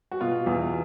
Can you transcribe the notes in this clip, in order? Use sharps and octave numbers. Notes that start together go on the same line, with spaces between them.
F#4
B2 F4
E2